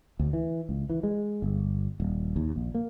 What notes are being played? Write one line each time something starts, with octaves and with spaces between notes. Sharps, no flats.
D2
E3
C#2
E3
G#3
G1
D#1
D#2
A#1
A#3